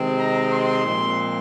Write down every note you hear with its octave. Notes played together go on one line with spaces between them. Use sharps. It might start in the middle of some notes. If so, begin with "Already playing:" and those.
Already playing: C3 D#3 G#3 C4
A#5
C6
A#2 F3 G#3 C4